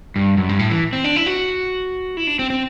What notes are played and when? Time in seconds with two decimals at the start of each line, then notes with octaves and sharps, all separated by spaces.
0.16 G2
0.37 F#2
0.49 G2
0.59 A2
0.71 E3
0.93 C4
1.04 D4
1.16 E4
1.26 F#4
2.17 E4
2.27 D4
2.39 C4
2.50 C4